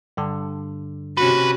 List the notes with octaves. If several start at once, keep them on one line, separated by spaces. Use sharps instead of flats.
G2 D3
C3 C#4 F#4 B4